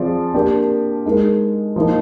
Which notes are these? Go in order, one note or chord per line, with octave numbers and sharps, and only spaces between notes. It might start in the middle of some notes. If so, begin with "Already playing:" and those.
Already playing: F3 C4 F4 G#4 D5
A#3 D4 G4 A#4 D5
G#3 D#4 A#4
F3 A#3 D#4